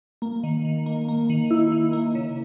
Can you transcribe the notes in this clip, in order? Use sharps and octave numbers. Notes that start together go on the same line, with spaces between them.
A#3
D#3
D#3
A#3
A#3
D#3
E4
D#3
A#3
C#3